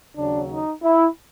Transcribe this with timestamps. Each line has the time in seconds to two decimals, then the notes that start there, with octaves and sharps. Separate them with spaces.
0.16 D#2 C#3 F#3 D4
0.49 D#4
0.83 E4